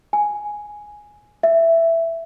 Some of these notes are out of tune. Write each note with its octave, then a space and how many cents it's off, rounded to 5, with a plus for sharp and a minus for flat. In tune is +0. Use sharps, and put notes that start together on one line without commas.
G#5 +0
E5 +10